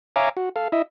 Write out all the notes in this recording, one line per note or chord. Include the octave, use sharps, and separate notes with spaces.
C#5 E5 F5 G#5 A#5 D6
F#4
A4 F5
E4 D#5 E5